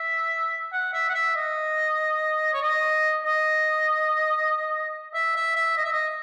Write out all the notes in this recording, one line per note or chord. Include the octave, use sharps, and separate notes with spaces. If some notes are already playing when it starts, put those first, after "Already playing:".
Already playing: E5
F#5
E5
F#5
E5
D#5
C#5
D#5
D#5
E5
E5
E5
D#5
E5
D#5